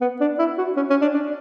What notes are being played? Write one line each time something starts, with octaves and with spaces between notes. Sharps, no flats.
B3
D4
E4
F#4
C#4
C#4
D4
D4